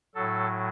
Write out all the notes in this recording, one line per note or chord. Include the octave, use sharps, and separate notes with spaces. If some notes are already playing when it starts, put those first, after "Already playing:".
A2 F#3 A4